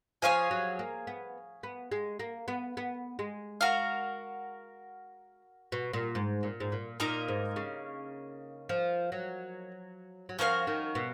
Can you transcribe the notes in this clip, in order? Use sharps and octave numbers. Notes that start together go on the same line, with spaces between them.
F3 G#4 C#5 F5 G#5
F#3
A#3
B3
B3
G#3
A#3
B3
B3
G#3
F#4 A#4 F5
B2
A#2
G#2
A#2
G#2
A#2
A#2 A#3 D#4 A#4
G#2
C#3
F3
F#3
F#3
F3 C#4 F#4 A#4 F5
D#3
B2